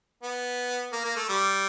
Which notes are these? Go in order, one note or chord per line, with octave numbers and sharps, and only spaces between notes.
B3
A#3
A#3
A3
G3